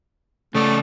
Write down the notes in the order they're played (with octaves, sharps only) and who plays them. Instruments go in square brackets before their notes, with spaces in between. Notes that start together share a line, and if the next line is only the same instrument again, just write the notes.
[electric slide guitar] C#3 D5 [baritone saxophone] A3